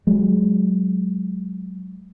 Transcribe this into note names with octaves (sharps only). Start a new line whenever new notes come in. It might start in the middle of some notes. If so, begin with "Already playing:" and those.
F#3 G#3